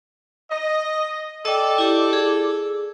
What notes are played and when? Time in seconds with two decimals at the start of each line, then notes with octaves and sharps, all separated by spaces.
0.50 D#5
1.45 A4 D5 D#5 G5
1.78 E4 G4
2.13 G#4